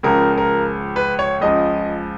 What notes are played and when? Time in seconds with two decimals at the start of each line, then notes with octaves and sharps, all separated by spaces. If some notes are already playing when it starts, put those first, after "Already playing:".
0.03 C#2 C#3 F3 A#4
0.38 A#4
0.96 B4
1.19 C#5
1.41 C#2 C#3 F3 D#5